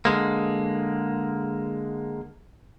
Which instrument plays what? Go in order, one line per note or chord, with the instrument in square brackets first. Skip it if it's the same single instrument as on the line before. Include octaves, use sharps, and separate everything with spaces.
[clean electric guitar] D3 G#3 A#3